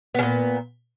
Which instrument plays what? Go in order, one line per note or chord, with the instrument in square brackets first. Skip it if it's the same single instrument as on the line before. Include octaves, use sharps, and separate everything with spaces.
[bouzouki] B3
C#3
A#2